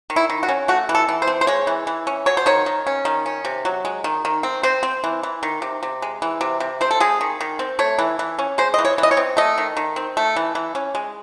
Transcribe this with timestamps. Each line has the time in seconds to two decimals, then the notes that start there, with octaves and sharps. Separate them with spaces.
0.10 D#3
0.16 E4
0.30 D#3
0.43 F#4
0.49 C#4
0.68 A3 F#4
0.89 E3
0.95 A4
1.09 E3
1.22 C5
1.27 C4
1.41 C5
1.47 G#3 C#5
1.67 E3
1.87 E3
2.07 C#4
2.26 F#3 C#5
2.37 C5
2.46 D#3 C#5
2.66 D#3
2.87 C#4
3.05 D#3
3.26 C#4
3.45 C3
3.65 F#3
3.85 G#3
4.04 D#3
4.25 D#3
4.43 C4
4.63 C4 C5
4.83 C4
5.04 E3
5.23 E3
5.43 D#3
5.62 C3
5.83 C3
6.02 G#3
6.22 E3
6.41 C3
6.60 C3
6.81 C4 C5
6.91 A4
7.00 G#3 G#4
7.21 D#3
7.41 D#3
7.59 C4
7.79 A3 C#5
7.99 E3
8.19 E3
8.39 C#4
8.58 G#3 C5
8.74 E3 D#5
8.85 C#5
8.98 E3
9.03 D#5
9.11 C#5
9.17 C4
9.37 A3 D#5
9.58 D#3
9.77 D#3
9.96 C4
10.17 A3
10.36 E3
10.55 E3
10.75 C#4
10.95 G#3